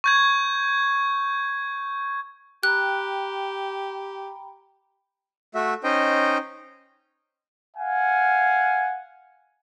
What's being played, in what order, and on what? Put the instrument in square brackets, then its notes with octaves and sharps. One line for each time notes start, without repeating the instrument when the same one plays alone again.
[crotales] C#6 G6 G#6
[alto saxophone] G4 [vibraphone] G5 A#5 B5 [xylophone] F#6
[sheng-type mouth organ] A3 F#4 E5
C#4 D#4 C5 D#5 G5
[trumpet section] F5 F#5 G#5